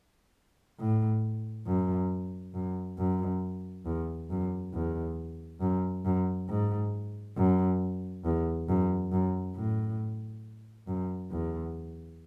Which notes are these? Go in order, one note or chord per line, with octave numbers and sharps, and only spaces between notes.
A2
F#2
F#2
F#2
E2
F#2
E2
F#2
F#2
G#2
F#2
E2
F#2
F#2
A2
F#2
E2